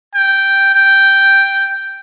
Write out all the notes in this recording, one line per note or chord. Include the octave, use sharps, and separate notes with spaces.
G5
G5